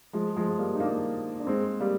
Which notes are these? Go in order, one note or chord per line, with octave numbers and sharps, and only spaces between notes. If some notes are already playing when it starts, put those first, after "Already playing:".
F3 G#3
F3 G#3
G#3
G3 A#3
D#4
A#3 D4
D4
G#3 C4
G3 A#3